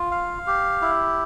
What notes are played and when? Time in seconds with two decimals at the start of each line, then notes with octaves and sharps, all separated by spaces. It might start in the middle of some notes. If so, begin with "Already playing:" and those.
Already playing: F4
0.11 F5
0.47 G4
0.82 E4